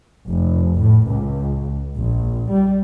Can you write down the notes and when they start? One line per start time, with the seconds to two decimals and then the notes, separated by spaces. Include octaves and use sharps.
0.28 F1
0.81 A2
1.09 C#2
1.95 A#1
2.50 G3